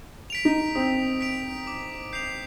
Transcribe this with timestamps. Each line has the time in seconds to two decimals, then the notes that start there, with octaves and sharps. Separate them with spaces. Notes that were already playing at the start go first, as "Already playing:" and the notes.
0.30 B6 D7 F7
0.45 D#4
0.75 C4 D#6
1.21 B6 D7 F7
1.67 D6
2.13 G6 C7 F7